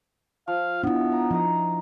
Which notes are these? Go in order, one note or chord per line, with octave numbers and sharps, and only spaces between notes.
F3 F5
B3 D4 E4
A#5
F3 D#4 A#5 D#6